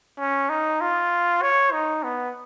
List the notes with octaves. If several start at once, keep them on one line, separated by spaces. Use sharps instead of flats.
C#4
D#4
F4
C#5
D#4
B3